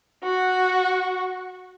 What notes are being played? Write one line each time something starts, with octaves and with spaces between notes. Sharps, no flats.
F#4 C#6